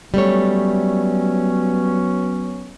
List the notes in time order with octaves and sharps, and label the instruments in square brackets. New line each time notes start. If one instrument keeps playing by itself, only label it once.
[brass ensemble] F#3 B3 C#4 [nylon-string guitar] G3 A3 C#5